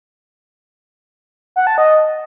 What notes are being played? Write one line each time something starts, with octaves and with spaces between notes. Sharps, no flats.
F#5
A5
D#5